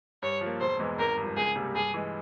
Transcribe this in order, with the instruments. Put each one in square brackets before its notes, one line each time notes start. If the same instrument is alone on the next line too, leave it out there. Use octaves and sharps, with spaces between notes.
[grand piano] G2 [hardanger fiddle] C#5
[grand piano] F3 A#3
[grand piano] E1 [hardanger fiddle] C5
[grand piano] E2 E3 G#3
[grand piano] G#1 [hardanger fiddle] A#4
[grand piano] G2 F3
[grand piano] C#2 [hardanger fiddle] G#4
[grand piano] C3 G3 A#3
[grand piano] G2 [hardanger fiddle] G#4
[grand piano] E3 G#3